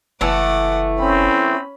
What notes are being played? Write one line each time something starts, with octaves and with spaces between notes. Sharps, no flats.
F#1 E3 A3 F#5 D6
C4 C#4 B5